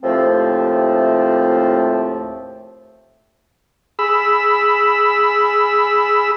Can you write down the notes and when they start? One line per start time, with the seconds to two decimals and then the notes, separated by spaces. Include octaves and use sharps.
0.03 D#2 A2 C3 F3 A3 C4
3.99 G#4 B5 E6